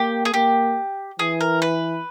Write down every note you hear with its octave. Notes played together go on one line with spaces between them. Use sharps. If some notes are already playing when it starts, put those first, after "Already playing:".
Already playing: A#3 G4
G#4
A#3 G4
E3 G#4
A#4
B4